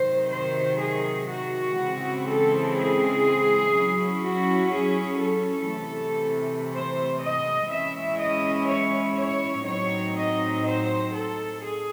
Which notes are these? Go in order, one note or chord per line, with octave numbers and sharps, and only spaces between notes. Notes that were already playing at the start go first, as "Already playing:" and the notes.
Already playing: C3 D#3 F#3 C5
C5
G#4
F#4
C#3 E3 G#3 C4 E4
A4
G#4
F#3 C#4 E4
F#4
G#4
A4
C3 E3 A3
C5
D#5
E3 G#3 C#4 E4 E5
D#5
C#5
C#5
A2 F#3 C4 D#4 C#5
D#5
C5
A4
G#4